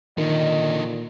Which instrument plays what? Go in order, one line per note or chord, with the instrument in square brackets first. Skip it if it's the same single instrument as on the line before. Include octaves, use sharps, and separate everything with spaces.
[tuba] A#2 [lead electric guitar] D3 D#4 [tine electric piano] D#3 [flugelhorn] D#5